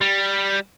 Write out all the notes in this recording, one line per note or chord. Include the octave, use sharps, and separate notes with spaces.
G3